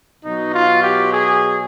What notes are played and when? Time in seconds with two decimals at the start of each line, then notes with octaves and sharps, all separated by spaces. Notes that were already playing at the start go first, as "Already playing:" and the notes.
0.24 B2 F#3 D#4
0.54 F4
0.82 G4
1.12 G#4